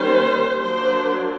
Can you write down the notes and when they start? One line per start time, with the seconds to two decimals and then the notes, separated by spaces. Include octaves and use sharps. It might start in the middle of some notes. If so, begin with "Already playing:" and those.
Already playing: D#3 G3 A#3 C#4 C5
0.61 F#3 A#3 D4 C5